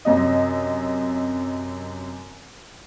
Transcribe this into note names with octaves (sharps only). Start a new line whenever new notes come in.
F#2 C3 D#5